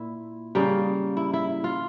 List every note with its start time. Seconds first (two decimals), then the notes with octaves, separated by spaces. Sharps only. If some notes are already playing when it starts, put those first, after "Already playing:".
Already playing: A#2 E4
0.55 C#3 G3 A#3
1.17 E4
1.34 E4
1.64 F4